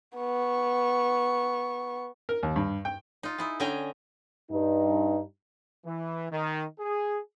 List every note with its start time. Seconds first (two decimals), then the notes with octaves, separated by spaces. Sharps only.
0.18 B3 C#6
2.29 A#4
2.43 D#2
2.56 G2
2.85 G5
3.23 D#4 F4
3.38 D#4 E4 G#4
3.60 D3 C#4 D#5 G5 G#5 A#5
4.50 G2 D#4
5.85 E3
6.32 D#3
6.80 G#4